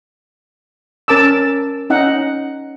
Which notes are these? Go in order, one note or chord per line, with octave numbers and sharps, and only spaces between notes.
C#4 A#4 A5 D6 E6
C#4 D#4 F#5